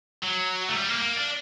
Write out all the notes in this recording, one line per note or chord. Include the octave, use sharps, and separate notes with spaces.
F#3
A3
G3
A#3
A#3
D4